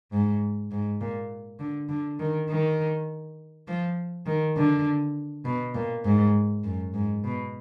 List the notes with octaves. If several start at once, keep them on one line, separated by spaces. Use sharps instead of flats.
G#2
G#2
A#2
D3
D3
D#3
D#3
F3
D#3
D3
B2
A#2
G#2
F#2
G#2
B2